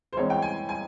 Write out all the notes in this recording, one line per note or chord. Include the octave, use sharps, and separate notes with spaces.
C5
E2 E3 G#3 C4 C#5
G5
G#5
G#5